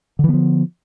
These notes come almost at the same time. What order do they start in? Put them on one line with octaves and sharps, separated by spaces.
D3 E3 B3 F3